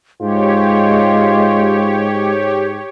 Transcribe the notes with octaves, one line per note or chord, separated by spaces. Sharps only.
G#2 G#3 F4 G4 C#5